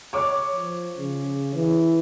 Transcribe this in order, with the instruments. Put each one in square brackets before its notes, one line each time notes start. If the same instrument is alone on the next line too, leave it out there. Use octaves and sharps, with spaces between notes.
[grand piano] C#5 D6
[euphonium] F3
C#3
E3